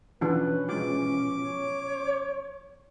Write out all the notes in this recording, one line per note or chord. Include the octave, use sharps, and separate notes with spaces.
B2 E3 F3 C#4 D4 F4 B4
E3 G#3 F4 D6
C#5